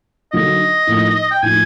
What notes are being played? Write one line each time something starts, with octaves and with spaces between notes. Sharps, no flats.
D3 F#3 A#3 D#4 F#4 D#5
A2 F3 A#3 D#4
G5
A2 F3 A#3 D#4 G#5